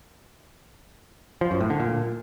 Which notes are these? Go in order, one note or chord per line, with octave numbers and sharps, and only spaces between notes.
F3
F#2
A2
D3
A#2